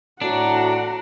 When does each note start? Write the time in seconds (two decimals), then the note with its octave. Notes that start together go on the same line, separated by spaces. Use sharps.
0.22 A2 D4 F#4 F#5 A#5